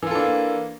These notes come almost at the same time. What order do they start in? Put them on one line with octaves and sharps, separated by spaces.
E3 F4 A4 D4 A#3